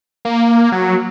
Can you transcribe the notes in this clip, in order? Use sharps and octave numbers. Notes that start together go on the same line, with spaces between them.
A#3
F#3